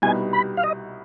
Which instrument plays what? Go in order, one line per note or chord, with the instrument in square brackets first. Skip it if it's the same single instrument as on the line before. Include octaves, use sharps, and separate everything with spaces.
[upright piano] C2 B2 G3 B3 D#4 [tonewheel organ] G#5
[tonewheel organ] B5
F5
D#5